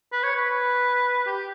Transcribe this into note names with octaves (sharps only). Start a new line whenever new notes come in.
B4
C#5
B4
G4